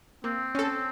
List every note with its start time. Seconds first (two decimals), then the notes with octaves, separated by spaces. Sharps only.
0.24 A#3 C4
0.55 C#4 A4